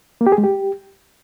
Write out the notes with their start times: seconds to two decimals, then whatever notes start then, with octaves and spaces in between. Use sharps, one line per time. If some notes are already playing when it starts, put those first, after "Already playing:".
0.21 A#3
0.27 G4
0.32 G#4
0.38 G#3
0.44 G4